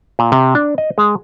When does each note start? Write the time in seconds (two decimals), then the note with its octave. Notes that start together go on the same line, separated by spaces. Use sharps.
0.19 A#2
0.32 C3
0.55 D4
0.78 D#5
0.98 G#3